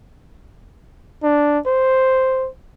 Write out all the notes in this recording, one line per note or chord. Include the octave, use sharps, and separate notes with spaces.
D4
C5